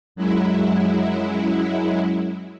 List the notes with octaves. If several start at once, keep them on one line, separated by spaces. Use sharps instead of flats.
F#2 F#3 G#3 E4